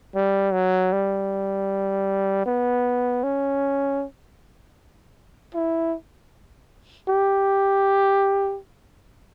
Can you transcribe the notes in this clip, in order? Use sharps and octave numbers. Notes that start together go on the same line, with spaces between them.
G3
F#3
G3
B3
C#4
E4
G4